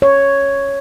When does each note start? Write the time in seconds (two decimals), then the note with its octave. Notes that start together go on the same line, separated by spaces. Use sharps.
0.02 C#5